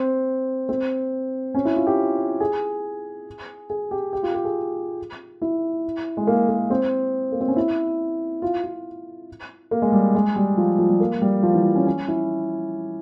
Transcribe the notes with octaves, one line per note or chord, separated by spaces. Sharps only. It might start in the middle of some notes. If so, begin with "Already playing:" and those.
Already playing: C4
C4
C#4
E4
F4
G4
G#4
G#4
G4
G4
F4
G4
G#4
E4
G#3
A#3
A#3
C4
A#3
C4
C#4
E4
F4
F4
A#3
G#3
G3
G#3
G3
F3
F3
G3
A#3
G3
F3
E3
F3
C#4
C#4
E4